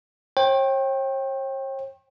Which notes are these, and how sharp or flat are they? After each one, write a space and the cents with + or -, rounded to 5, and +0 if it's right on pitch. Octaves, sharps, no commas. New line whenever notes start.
C#5 -45 G5 +0